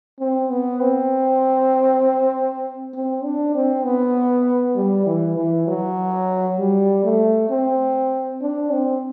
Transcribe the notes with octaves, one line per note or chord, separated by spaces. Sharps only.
C4
B3
C4
C4
D4
C4
B3
G3
E3
E3
F#3
G3
A3
C4
D4
C4